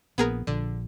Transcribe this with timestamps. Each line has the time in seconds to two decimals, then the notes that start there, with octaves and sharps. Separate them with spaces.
0.18 A#1 A#3 B3 G#4 A#4
0.47 A#1 D3